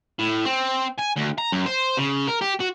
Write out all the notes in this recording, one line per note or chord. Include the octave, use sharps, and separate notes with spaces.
A2
C4
G#5
D2
A#5
F#2
C5
C#3
A#4
G4
F#4